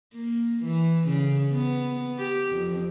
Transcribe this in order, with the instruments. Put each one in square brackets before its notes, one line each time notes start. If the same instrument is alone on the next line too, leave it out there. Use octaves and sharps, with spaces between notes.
[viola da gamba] A#3
E3
C#3
B3
G4
F2